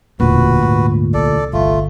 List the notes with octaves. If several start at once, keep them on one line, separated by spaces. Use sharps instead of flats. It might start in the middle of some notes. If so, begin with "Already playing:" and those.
E1 D2 A#2 C#3 F#4 B4
G#2
C2 A4 D5
G1 A3 F4